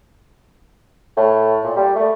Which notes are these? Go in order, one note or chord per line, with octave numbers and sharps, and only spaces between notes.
A2
A#2
G3
A3